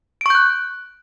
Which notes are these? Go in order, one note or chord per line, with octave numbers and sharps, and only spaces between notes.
C#6 F#6 G6 D7